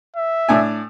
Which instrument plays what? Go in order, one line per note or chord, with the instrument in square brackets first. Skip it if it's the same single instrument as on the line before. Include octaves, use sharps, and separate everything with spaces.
[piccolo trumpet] E5
[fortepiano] A2 D4 G#5